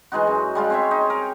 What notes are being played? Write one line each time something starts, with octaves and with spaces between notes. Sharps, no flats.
E3 G#3 D#4 F#4
F#2
G3 G#3 F4
C4 C#5 E5
D#4
A#4